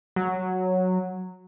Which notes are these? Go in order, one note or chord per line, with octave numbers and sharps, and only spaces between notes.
F#3